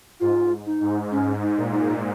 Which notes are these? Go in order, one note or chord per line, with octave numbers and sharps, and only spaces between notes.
G#2 F4
D#4
G#2
G#2 C#4
D#4
A#2
D#4